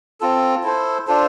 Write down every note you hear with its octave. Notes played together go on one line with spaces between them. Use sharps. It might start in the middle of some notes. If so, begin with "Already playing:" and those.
C4 F4 A4
E4 A4 C5
D4 F4 A4 C5